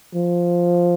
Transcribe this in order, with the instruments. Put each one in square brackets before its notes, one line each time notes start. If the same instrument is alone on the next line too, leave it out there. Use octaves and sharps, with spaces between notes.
[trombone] F3